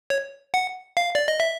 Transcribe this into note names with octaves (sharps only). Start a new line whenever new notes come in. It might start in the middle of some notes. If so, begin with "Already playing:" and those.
C#5
F#5
F5
D5
D#5
E5